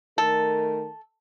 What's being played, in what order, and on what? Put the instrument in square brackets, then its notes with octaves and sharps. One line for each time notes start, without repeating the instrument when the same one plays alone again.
[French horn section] D#3 A3 A#4 [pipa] A4